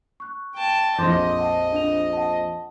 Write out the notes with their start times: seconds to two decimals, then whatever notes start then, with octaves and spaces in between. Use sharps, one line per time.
0.20 C#6 F#6
0.55 G5 A5
0.98 A#1 F2 D#5 C6 D6 G6
1.38 F#5 A5
1.73 D4 F7
2.13 F#5 A5